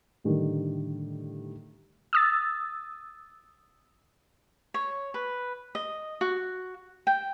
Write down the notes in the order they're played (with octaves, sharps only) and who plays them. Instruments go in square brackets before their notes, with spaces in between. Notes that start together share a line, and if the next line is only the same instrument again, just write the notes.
[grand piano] A2 D3 D#3 G3
[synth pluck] D#6 E6 A6
[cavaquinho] C#5
B4
D#5
F#4
G5